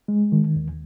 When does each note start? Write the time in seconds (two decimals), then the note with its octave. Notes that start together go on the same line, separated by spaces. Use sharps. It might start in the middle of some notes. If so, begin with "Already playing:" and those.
0.08 G#3
0.32 D#3
0.56 D#2